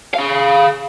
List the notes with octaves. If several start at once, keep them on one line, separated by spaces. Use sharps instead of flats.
G#4 F5